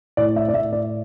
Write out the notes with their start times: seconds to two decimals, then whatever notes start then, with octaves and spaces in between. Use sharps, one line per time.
0.17 A2 D5
0.36 E5
0.49 D5
0.53 A2 E5
0.73 D5